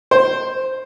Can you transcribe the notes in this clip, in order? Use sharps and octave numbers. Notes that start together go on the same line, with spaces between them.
C5